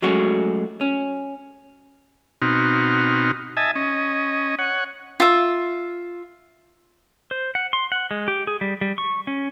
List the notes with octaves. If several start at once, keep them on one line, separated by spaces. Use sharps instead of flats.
F#3 G#3 A3 C#4 F#4
C#4
B2 C4 D#4 F#4 F6
D#5 E5 G#5 A5
C#4 D#5
C#5 F#5
F4 E5
C5
F#5
C6
F#5
G#3
G4
G#4
G3
G3
C#6
C#4